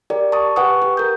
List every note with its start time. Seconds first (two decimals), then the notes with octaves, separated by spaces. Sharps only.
0.10 G4 A#4 D5
0.32 A5 C#6 D#6
0.56 G4 B4 F#5 G#5 C#6 D#6
0.82 G4
0.97 A#4 G6